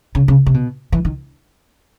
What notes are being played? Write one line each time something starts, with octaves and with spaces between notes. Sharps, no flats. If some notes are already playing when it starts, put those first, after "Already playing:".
C#3
C#3
C3
B2
E3
D#3